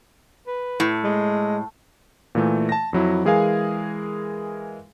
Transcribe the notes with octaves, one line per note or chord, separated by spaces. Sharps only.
B4
A2
G#3
A#2 E3 A3
A5 A#6
F2 F#3 E4
E3 G#3 G#4 A#4 F5 G#5